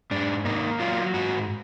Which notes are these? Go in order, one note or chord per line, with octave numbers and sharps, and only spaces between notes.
G#2 D4
A#3 D#4
F#3 F4
G#2 F#4